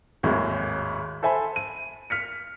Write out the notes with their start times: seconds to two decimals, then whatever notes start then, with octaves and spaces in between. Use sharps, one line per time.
0.23 G#1 D#2 A2 F#3 G#3
1.23 A4 C5 E5 G#5 B5
1.56 D#7
2.10 F6 B6 C#7